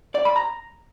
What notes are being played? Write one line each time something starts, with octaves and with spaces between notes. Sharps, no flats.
D5
B5
A#5